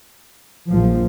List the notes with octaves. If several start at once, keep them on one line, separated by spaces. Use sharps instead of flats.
A#1 A#2 F3